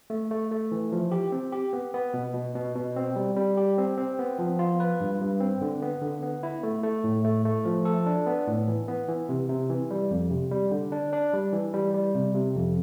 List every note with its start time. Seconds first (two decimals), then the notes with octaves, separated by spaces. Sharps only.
0.10 A3
0.31 A3
0.51 A3
0.72 E3
0.92 F3
1.12 G4
1.32 C4
1.52 G4
1.73 B3
1.94 B3
2.14 B2
2.34 B2
2.55 B2
2.76 B2
2.96 C4
3.16 G3
3.37 G3
3.57 G4
3.78 C4
3.97 C4
4.19 B3
4.39 F3
4.59 F4
4.80 B4
5.01 G2
5.21 G2
5.40 C4
5.61 D3
5.82 B3
6.02 D3
6.23 B3
6.43 E4
6.63 A3
6.83 A3
7.04 A2
7.24 A3
7.45 A3
7.65 F3
7.85 A4
8.06 D4
8.26 B3
8.47 A2
8.68 E3
8.88 B3
9.08 E3
9.29 C3
9.49 C3
9.70 E3
9.91 G3
10.11 F2
10.31 C3
10.51 G3
10.71 D3
10.92 D4
11.13 D4
11.33 G3
11.53 E3
11.74 G3
11.94 G3
12.15 C3
12.35 C3
12.55 F2